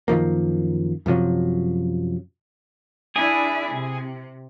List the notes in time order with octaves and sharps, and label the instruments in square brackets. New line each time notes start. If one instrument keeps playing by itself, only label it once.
[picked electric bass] F#2 D#3 F3 A#3
F#2 C3 F3 F#3
[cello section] D4 E4 [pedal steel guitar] G#4 G#5
[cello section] C3